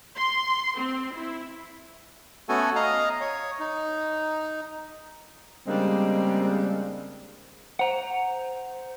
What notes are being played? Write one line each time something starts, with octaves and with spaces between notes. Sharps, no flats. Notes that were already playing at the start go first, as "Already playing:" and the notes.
C6
C4
E4
A3 B3 C#4 F#4 A4 G#5
D#5 F5 A#5 D#6
C#5
D#4
C#3 G3 G#3 A#3 C4 D4
C5 F#5 A#5